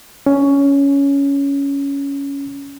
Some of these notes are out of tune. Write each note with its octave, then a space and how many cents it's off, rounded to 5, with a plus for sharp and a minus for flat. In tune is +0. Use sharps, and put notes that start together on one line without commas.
C#4 +10